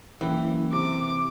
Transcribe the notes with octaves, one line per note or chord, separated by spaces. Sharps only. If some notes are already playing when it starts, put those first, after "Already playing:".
F#1 E3 G4
C3 D6